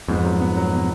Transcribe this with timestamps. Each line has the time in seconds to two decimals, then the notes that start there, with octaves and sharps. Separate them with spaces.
0.08 F2 G#2 B3
0.25 F#3
0.40 B3
0.57 F#3
0.72 B2